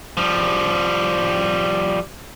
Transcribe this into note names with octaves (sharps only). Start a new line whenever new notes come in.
F3 G3